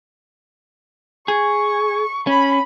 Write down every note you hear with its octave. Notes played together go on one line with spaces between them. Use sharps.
G#4 C#6
C#4 B5